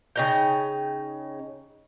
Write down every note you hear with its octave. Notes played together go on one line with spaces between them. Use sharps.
C#3 D#4 G5